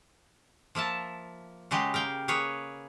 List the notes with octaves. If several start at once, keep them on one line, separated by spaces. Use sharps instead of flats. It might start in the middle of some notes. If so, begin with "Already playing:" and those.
F3 A#3 E5 A5
C#3 F#3 G#3 G4
A#4 F5 G5
A#3 G#4 B4 C#5